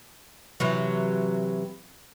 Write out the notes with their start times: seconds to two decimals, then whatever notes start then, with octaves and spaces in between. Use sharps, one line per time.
0.60 C3 E3 F#3